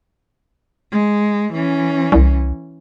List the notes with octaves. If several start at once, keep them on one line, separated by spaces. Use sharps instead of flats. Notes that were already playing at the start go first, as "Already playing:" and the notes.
G#3
E3 C#4
C2